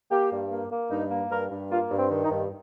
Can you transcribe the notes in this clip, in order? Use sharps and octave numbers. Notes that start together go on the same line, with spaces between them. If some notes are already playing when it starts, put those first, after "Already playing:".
A#3 G4
G2
A#3
A#3
G2 D#4
A#3
G2 A#4
G2
A#3 F4
G2
C4
D#3
D#4
G2